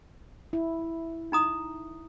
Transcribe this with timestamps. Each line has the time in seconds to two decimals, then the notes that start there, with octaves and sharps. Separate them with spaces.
0.53 E4
1.32 D#4 A#5 D#6